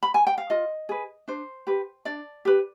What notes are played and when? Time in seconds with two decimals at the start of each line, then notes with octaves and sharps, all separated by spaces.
0.03 B5
0.14 G#5
0.27 G5
0.38 F5
0.50 F4 D#5
0.89 G#4 B4
1.28 D4 C5
1.67 G4 B4
2.05 D4 D5
2.45 G4 B4